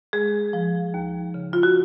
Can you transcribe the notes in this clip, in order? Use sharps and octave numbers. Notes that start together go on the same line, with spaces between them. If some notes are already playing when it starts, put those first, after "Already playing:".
G#3 G#4
F3
D#2
C#3
F4
F#4